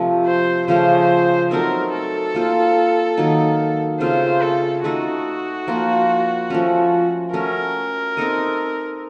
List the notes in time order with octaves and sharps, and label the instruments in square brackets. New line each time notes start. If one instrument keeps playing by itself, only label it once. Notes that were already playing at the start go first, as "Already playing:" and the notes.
Already playing: [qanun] C3 F3 A3
[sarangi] C5
[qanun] C#3 F3 A3 C#4 [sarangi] C5
[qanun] F#3 A3 C4 D#4 [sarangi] A#4
[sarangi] A4
[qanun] A#3 F4 C5
D#3 F#3 A#3 D#4
[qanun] C#3 A3 C4 F4 [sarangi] C5
[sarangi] A4
[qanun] A3 D#4 A4 D#5 [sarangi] F#4
[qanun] F3 A#3 F4 C5
F3 A3 C#4
[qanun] A3 C#4 F#4 [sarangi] A#4
[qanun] C4 D#4 A4 D#5